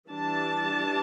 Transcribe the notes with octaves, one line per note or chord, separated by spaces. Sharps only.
E3 G3 D4 A5